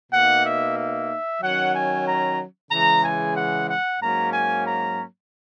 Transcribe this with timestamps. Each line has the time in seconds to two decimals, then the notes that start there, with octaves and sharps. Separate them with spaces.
0.11 B2 A#3 D#4 F#5
0.44 E5
0.76 E5
1.41 D#3 F#3 C#4 F#5
1.74 G#5
2.06 A#5
2.71 C#3 E3 G#3 A#5
3.03 G#5
3.36 F#5
3.68 F#5
4.01 G#2 F#3 A#3 C#4 A#5
4.33 G#5
4.66 A#5